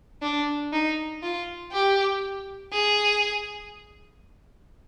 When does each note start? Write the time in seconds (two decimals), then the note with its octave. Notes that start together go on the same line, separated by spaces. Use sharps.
0.22 D4
0.73 D#4
1.22 F4
1.73 G4
2.73 G#4